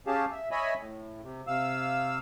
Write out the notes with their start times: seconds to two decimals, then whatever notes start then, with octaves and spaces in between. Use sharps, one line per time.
0.07 C#4 G4 G#4 F5 A5
0.31 E5
0.51 C#5 D#5 E5 G#5 B5
0.78 A2
1.23 C3
1.47 C3 F5 E6